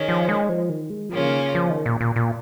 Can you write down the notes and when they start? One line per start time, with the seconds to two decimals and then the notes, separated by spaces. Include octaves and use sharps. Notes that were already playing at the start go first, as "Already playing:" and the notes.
Already playing: D#3 C#4 G#4
0.08 F3
0.29 G#3
0.49 F3
0.69 D#3
0.90 G#3
1.09 C#3 F3 A#3 C#4 F4
1.25 D#3
1.55 F3
1.70 D#3
1.86 A#2
2.01 A#2
2.16 A#2